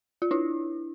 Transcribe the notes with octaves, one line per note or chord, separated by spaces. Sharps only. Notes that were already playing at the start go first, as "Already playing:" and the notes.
F4
D4 E4